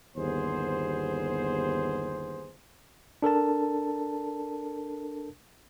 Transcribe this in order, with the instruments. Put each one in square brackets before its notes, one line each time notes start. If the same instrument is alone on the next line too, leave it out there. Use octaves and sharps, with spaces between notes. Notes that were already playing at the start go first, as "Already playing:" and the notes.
[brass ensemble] G1 D#2 B3 G#4 C5
[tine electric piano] D4 A4 A#4 A5